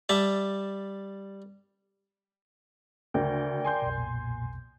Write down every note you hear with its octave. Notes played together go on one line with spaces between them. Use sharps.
G3 E5 A5
D2 C#3 A#4 D5 G5
G#5 C6 G6
B1 F2 B2
A#2